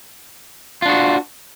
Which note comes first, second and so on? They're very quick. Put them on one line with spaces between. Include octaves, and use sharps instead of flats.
F4 D4 F#4